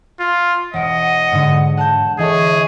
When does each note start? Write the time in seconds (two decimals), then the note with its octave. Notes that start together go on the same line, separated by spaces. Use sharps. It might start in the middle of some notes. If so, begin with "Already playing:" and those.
0.20 F4
0.73 E1 D#5 F#5 D7
1.32 G#2 D3
1.77 F#5 A5 G6
2.18 E3 G#4 A4 C#5 D#5